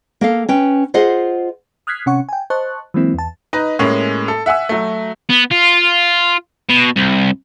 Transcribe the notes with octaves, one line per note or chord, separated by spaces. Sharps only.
A#3 A4 F5
C#4 B4 G5
F4 G#4 C5 D#5 F#5
D#6 F6 F#6 G#6 B6 C7
C3 C#4 F#5 C#6
G5 G#5
C5 D#5 A5 C#6 F#6
E3 F#3 G#3 A#3 C4 E4
E2 A5
D#4 B4 D#5
A2 G#3 A#3 C#4
A4
E5 F#5 G#5 E6
F#3 A3
B3
F4
B2
C2